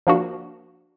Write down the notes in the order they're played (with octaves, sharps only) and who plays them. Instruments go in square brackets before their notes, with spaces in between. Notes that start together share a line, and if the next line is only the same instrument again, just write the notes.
[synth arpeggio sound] F3 A#3 D4 F#4